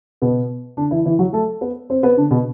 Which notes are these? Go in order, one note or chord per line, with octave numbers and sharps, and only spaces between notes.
B2 B3
D3 D4
E3 E4
E3 E4
F#3 F#4
A3 A4
B3 B4
C4 C5
B3 B4
D3 D4
B2 B3